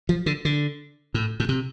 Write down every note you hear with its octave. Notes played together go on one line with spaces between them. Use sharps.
F3
D3
D3
A2
A2
C3